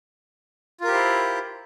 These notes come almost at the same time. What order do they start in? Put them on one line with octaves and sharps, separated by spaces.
F4 A#4 G4 C5 E4